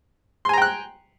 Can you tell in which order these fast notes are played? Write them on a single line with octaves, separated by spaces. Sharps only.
C6 G#5 A#5 G5 F#6